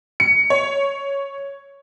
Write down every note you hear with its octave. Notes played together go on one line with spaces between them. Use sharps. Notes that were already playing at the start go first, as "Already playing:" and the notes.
C#7
C#5